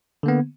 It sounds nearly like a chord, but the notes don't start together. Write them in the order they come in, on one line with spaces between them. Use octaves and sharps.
D3 A#3 B3